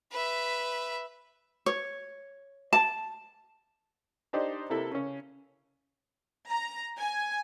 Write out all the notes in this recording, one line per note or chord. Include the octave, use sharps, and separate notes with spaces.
B4 E5
C#5
A5
D4 D#4 G4 C5 D5 D#5
C3 A#3 E4 A4
C#3 C#4
A#5
G#5